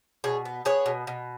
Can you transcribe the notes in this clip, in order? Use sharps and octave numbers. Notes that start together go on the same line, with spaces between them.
B2 G#4 C#5
B3
B3 G#4 C#5
B2
B2